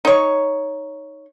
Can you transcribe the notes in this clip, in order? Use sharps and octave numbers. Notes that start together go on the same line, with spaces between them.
D#4 C#5